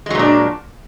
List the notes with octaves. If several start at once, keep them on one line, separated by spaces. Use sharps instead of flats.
A#2 F#3 G#3 D4